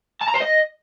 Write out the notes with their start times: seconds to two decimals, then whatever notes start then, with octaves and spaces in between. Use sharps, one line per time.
0.22 A5
0.29 A#5
0.35 C5
0.42 D#5